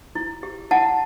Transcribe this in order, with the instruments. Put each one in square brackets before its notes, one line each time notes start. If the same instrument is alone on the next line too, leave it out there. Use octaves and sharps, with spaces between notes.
[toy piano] E4
G4
E4 F#5 A5